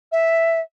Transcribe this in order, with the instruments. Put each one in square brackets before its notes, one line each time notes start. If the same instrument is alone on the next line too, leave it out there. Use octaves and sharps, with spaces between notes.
[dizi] E5